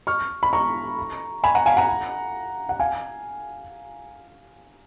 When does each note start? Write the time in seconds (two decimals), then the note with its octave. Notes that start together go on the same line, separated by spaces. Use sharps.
0.07 C#6 F6
0.43 B5
0.53 A#5 C#6
1.44 G#5 B5
1.55 F#5 A#5
1.66 F5 G#5
1.77 F#5 A#5
2.69 F#5
2.80 F5 G#5